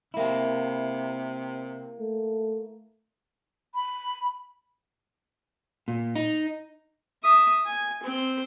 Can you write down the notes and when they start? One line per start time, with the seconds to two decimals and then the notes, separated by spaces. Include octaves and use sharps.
0.14 C3 A#3 E4
2.00 A3
3.75 B5
5.88 A#2
6.16 D#4
7.23 E5 D#6
7.66 G#5
8.03 C4 C5